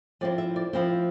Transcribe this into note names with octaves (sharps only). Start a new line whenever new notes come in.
F3 C4 E4 D5
E5
D5
F3 C4 E4 C5